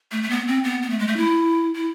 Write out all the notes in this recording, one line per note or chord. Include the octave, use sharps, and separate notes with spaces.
A3
A3
B3
C4
B3
B3
A3
G#3
A3
E4
E4